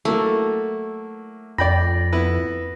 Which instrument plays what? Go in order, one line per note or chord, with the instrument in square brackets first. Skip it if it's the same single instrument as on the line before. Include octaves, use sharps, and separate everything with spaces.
[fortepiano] F#3 A#3 E4 [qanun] A3
[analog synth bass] F2 [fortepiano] D5 G5 B5 [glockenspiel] A#6
[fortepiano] B3 E4 B4